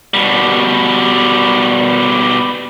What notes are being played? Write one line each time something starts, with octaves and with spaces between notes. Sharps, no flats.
B2 G3